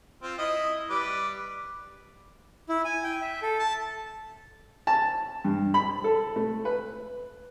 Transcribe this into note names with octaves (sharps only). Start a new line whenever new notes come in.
C4 F4
E4 D#5
G3 B4 D6
E4
G#5
G5
E5
A4
A5
A5
G2
B5
A4
A3
B4